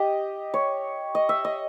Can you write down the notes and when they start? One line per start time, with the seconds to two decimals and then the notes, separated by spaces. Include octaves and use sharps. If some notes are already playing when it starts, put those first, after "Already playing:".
Already playing: G4 D#5
0.54 C#5
1.15 D#5
1.29 E5
1.45 D#5